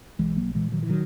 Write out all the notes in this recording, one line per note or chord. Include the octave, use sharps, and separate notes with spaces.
B1 E3 G#3
F#3 A#3
A#2 E3 G#3
D#3 F#3
E3
D#3 F#3